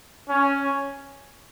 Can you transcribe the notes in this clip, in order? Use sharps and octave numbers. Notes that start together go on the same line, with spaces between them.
C#4